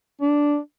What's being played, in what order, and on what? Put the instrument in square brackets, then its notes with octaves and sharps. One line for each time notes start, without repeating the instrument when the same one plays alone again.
[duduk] D4